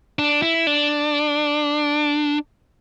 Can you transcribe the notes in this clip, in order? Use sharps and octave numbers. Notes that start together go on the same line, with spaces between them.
D4
E4
D4